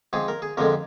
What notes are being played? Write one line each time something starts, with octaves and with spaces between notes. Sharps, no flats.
G#2 F3 C4 G#4
A#4
G#4
F2 D3 F3 G#3 C4 A#4